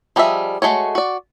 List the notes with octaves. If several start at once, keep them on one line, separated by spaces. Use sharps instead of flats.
F3 G3 G#4 D#5 E5
G#3 A3 F#4 C#5
F#4 D5